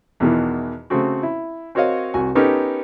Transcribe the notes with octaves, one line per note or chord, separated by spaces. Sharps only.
E2 B2 D#3 E3
C#3 A3 C4 F#4
E4
C4 F#4 A#4 C#5 D#5 F5
C2 F#4 G#5
B3 C#4 D#4 G4 A4 A#4